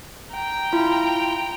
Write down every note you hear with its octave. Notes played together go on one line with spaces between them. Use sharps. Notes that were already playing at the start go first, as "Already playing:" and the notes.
G5 A#5
E4 F4